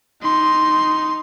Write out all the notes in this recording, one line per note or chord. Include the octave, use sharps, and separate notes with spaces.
D#4 C6